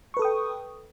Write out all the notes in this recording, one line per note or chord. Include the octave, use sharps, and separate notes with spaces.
A4 B4 G5 C#6 D#6